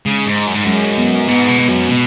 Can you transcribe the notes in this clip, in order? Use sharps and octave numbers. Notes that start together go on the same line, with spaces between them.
C#3 G#3
G#2
F#2
G#2
F#2 G#3
B3
G#2 B3
B2
B3
F#2
B2